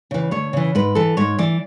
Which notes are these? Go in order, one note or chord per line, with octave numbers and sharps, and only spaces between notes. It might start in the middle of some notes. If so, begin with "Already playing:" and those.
C#3 E3
D2 C#5
C#3 E3
G#2 B4
E3 A4
G#2 C#5
E3 D5